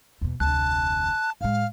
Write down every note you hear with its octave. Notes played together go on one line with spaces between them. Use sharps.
E2 B2
F1 D2 A5 F#6
A2 G#3 F5